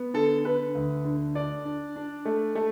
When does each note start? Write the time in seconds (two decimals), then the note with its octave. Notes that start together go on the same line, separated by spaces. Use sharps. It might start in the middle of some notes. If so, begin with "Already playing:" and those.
Already playing: B3
0.14 D3 A4
0.44 D3 B4
0.75 D2
1.05 D3
1.35 D4 D5
1.65 D4
1.96 D4
2.25 A3
2.55 A3